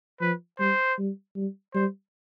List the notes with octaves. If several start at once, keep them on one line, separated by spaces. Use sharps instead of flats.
F3 B4
G3 C5
G3
G3
G3 C5